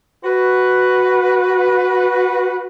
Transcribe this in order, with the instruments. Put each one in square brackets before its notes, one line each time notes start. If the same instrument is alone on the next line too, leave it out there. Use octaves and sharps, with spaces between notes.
[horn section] F#4 B4